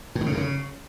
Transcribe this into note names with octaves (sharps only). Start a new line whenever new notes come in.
A2
D#3
C#3
F#2
C#3